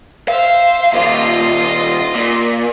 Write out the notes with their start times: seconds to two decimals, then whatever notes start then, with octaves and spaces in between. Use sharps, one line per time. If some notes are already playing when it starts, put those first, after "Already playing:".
0.28 C5 E5 F5
0.93 D#2 A#2 F4 D#5
2.15 A#2